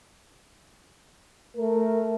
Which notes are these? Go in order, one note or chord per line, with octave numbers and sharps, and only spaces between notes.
A3 A#4